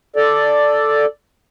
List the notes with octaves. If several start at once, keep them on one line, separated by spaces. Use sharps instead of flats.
A4 D5